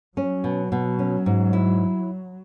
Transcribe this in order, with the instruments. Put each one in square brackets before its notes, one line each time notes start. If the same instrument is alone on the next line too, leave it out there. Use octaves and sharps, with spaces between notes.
[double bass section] F#3 [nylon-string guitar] C#4
[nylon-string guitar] B2
B2
C#4
G#2
E4